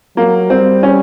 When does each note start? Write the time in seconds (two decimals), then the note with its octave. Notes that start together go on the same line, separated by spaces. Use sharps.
0.16 F#3 A#3
0.50 G3 C4
0.83 C#4